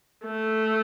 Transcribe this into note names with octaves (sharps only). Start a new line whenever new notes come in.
A3